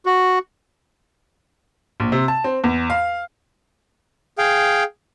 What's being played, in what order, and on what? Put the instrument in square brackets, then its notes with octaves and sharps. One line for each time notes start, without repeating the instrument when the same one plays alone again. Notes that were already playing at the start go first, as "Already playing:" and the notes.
[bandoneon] F#4
[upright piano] A#1
C3
A5
C4
E2
F5
[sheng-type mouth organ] G#4 F5 G5